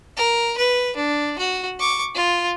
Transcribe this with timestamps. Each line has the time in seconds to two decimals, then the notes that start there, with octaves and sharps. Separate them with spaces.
0.17 A#4
0.58 B4
0.96 D4
1.39 F#4
1.80 C#6 D6
2.15 F4